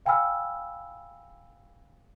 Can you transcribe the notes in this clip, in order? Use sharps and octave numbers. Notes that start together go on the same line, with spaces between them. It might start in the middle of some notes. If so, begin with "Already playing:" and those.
F5 G5 G#5 B5 E6 F6